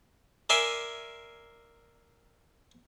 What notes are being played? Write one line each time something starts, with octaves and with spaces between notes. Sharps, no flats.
A#4 D5 E5 G#5 C6